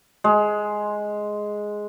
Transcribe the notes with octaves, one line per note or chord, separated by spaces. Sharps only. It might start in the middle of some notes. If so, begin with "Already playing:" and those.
G#3